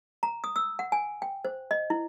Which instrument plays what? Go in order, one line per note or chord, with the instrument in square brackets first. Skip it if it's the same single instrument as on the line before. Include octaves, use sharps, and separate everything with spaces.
[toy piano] A#5
D#6
E6
F#5
G#5
G5
C5
D#5
E4